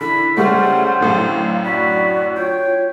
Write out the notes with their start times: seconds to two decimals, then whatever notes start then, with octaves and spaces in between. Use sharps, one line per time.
0.01 D3 E4 B5
0.37 C#3 G3 A3 C5 F#5
1.00 F#2 A2 D3 F5
1.65 F#4 D5 B5
2.36 F4 C#5 G5